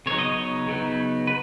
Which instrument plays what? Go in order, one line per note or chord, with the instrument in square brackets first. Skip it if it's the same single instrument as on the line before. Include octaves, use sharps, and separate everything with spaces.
[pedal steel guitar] C#3 F#3 B3 D#4 C#5
D#5
C#5
C#3 F#3 B3 D#4
B4